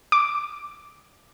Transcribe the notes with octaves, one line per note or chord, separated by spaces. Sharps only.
D6